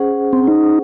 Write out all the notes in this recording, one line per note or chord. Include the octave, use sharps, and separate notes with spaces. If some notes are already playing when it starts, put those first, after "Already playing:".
Already playing: C#4 G#4 C5 F#5
C4
D#4